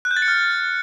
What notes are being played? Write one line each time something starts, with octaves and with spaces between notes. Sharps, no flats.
F#6
G6
A6
C#7
F6